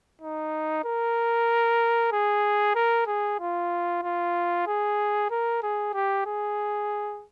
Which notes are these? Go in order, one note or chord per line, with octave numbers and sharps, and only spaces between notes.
D#4
A#4
G#4
A#4
G#4
F4
F4
G#4
A#4
G#4
G4
G#4